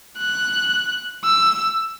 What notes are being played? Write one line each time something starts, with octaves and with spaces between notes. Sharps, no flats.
F#6
E6